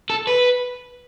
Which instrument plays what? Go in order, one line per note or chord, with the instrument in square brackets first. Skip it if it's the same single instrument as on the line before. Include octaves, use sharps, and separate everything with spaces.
[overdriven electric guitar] A4
B4